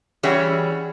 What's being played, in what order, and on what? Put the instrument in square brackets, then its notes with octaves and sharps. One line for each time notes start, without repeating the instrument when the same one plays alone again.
[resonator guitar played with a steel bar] E3 G3 C#4 F#4 G#4 C#5